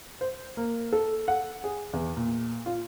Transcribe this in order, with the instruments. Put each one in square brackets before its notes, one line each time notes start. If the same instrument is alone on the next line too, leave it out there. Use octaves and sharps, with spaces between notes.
[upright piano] C5
A#3
A4
F#5
G#4
E2
A#2
F4